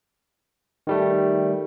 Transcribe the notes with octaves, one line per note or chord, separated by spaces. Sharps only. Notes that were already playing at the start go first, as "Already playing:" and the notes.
D#3 G3 A3